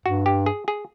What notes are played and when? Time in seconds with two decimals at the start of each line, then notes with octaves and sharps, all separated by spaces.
0.06 G2 F#4
0.26 G4
0.46 G#4
0.68 G#4